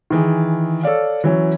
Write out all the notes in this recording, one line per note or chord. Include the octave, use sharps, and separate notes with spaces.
D#3 E3 G#4
A4 C#5 D5 F5
E3 F#3 C#4